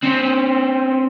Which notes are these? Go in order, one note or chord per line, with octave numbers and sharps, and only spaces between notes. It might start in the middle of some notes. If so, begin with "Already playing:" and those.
C4 C#4